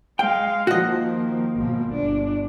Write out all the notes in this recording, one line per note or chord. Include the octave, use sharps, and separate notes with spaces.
G#3 F5 G5
D#3 F3 A#3 F#4 D#5
G#1 B2 F3
G1 D4